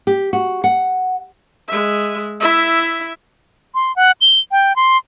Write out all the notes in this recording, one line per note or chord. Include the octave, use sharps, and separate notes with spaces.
G4
F#4
F#5
G#3 E5
E4 E5
C6
F#5
G7
G5
C6